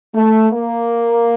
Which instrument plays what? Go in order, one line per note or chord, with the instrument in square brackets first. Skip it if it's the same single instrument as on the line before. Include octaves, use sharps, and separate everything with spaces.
[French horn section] A3
A#3